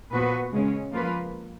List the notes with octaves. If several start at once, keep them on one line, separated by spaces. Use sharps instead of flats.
A#2 F3 B3 F#4 B4
C#3 G#3 C#4
F3 A#3 F4 B4